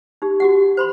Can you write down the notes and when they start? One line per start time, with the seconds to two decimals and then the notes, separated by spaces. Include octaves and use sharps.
0.22 D#4 G4
0.40 F#4 G4 F#5
0.77 C5 B5 C6